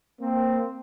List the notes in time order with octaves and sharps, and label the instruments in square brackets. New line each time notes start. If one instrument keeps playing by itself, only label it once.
[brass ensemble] A#3 C4